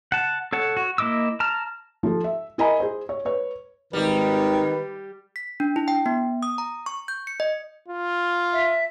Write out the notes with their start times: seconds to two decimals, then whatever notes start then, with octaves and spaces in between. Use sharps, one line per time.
0.12 F#5 A5
0.53 A4 C#5 F#5 A5
0.77 F#4
0.98 A#3 E4 D#5 D6 E6
1.40 A5 A#5 F6
2.03 F3 A4
2.24 E5
2.58 E4 A#4 D#5 G#5 A#5 B5
2.80 G#4 C5
3.09 C#5
3.25 B4 C#5
3.93 G#1 D#3 G3 G4 B4
5.36 B6
5.60 D4
5.76 E4
5.88 G5
6.06 B3
6.43 D#6
6.58 A#5
6.86 C#6
7.08 G6
7.27 C#7
7.40 D#5
7.88 F4
8.53 E5